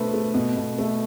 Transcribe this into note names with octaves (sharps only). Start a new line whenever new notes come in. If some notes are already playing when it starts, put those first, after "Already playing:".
Already playing: B2 D3 A3 C4 B4
A3
B2
B2
A3